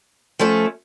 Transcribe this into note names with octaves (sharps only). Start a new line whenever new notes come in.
F3 A3 C#4